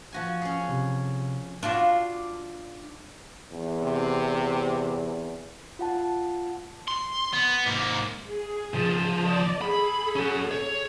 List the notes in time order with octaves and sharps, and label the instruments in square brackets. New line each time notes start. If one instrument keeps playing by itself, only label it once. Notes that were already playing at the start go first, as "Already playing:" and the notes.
[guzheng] F3 F#4 G#5
C#4 G#4
[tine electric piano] C3
[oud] D4 F4 F#4
[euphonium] E2
[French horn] C3
[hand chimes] F4 F#5 A5
[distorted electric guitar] C6
B3
G#2 A#3
[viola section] G#4
[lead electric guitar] C#2 F3
[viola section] D5 D#5
[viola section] G#4 A4 [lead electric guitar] B5
[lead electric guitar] C#4 F#4
C#5